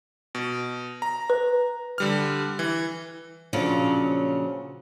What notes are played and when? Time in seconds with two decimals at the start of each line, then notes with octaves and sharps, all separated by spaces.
0.35 B2
1.02 A#5
1.30 B4
1.98 D3 G3 F6
2.59 E3
3.53 A#2 C#3 F3 F#3 C#4 D4